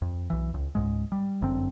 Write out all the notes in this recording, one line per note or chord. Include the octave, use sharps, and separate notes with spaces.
F2
B1 E3
C#2
C#2 G#2 G#3
G3
G1 F#2 D3 C4